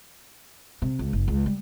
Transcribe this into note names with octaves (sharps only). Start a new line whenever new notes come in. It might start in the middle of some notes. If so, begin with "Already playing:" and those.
C3
C#2
F#1
C#2
G3